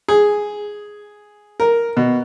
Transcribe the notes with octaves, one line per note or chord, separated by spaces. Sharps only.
G#4
A#4
B2